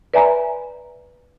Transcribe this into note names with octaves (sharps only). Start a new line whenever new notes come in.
B4 D5 E5 G#5 A#5 B5